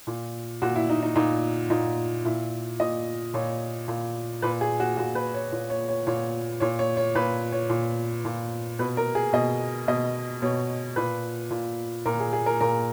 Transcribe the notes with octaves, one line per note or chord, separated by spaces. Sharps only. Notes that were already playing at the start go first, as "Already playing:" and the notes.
A#2
A#2 F#4
E4
D#4
D#4
A#2 D#4
A#2 D#4
A#2 E4
A#2 D#5
A#2 C#5
A#2
A#2 B4
G#4
F#4
A#2 F#4
B4
C#5
A#2 C#5
C#5
C#5
A#2 C#5
A#2 C#5
C#5
C#5
A#2 B4
C#5
A#2
A#2
B2 B4
A#4
G#4
B2 D#5
B2 D#5
B2 C#5
A#2 B4
A#2
A#2 A#4
G#4
G#4
A#4
A#2 A#4